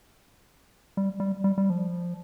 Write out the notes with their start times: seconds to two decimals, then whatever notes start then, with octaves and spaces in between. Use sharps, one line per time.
0.97 G3
1.20 G3
1.44 G3
1.58 G3
1.70 F3